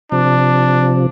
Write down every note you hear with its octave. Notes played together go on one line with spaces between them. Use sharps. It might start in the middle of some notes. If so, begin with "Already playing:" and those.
C3 F3 D4